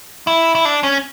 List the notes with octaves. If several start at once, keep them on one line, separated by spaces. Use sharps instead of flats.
E4
E4
D4
C#4